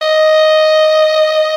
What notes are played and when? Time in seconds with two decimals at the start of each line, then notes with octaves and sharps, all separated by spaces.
0.02 D#5